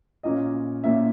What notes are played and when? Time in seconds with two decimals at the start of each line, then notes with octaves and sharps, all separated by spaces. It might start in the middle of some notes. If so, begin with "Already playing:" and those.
0.23 A#1 A#2 A#3 C#4 D#5
0.84 A#1 A#2 A#3 C#4 E5